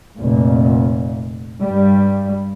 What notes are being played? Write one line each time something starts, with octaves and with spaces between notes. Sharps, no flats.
F1 A#2
G2 G3